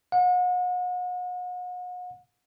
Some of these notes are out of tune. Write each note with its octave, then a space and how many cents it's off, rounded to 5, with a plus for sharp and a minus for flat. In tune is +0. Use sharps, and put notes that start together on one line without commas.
F#5 -40